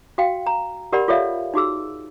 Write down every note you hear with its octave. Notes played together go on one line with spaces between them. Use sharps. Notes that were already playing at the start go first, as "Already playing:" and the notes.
F#4 F5 G5
A#5
G4 A#4 D5 F#5 B5
F4 A4 C#5 D5 E5 F5
D#4 F#4 G#4 E6